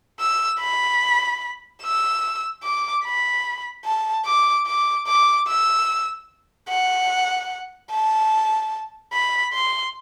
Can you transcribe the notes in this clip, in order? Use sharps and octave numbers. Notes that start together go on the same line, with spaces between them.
E6
B5
E6
D6
B5
A5
D6
D6
D6
E6
F#5
A5
B5
C6